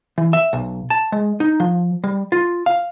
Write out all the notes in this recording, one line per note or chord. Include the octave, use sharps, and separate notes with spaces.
E3
E5
B1
A5
G#3
D#4
F3
G3
F4
F5